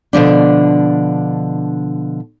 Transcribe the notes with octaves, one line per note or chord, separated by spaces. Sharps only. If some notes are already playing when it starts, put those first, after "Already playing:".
B2 D3 F3 D4